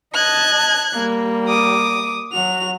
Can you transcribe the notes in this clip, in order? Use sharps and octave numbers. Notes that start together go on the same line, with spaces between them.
D#5 A5 F#6 G#6
G3 A#3
D6 D#6
F#3 F#4 F7